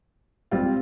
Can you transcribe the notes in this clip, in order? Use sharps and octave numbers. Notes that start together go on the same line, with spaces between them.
G3 C4 F4